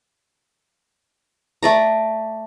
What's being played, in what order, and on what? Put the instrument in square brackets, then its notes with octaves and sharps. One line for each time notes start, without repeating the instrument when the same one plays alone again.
[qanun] A3 D5 A#5